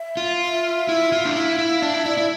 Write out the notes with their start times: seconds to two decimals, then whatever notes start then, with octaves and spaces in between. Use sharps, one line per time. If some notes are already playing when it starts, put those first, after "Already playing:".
Already playing: E5
0.17 F4
0.41 E5
0.89 E4
1.12 F4
1.25 D4
1.35 E4 F5
1.51 F5
1.59 E4
1.66 F5
1.82 D4 E5
1.94 E4
2.06 E4 D5
2.17 E4